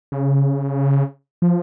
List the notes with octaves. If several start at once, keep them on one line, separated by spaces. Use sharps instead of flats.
C#3
F3